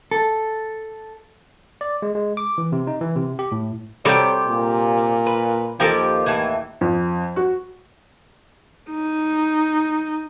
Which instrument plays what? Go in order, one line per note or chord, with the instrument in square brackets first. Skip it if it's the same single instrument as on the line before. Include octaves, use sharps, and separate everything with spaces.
[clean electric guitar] A4
[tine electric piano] D5
G#3
G#3
D6
E3
C3
D#4
E3
C3
G4
A2
[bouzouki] C3 G4 G5 [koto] G3 F#4 A4 [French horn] C#5
[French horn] A#2
[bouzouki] B4
[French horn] D#2 [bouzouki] F3 G4 [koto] A4 A#4 G#5
[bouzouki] A2 E3
[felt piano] F2
F#4
[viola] D#4